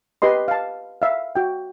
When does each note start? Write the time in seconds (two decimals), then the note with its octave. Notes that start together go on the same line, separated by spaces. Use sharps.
0.22 G4 B4 D#5 C6
0.48 F5 A5
1.02 E5 F5
1.36 F#4 G5